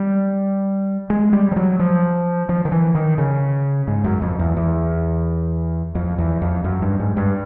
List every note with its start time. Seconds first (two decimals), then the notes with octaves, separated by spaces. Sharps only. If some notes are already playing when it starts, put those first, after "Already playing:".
Already playing: G3
1.10 G#3
1.33 G3
1.52 F3
1.56 F#3
1.79 F3
2.49 F3
2.65 D#3
2.72 E3
2.95 D#3
3.18 C#3
3.88 G#2
4.04 F#2
4.22 F2
4.39 E2
4.57 E2
5.95 F2
6.18 E2
6.42 F2
6.64 F#2
6.82 G2
7.00 G#2
7.17 G2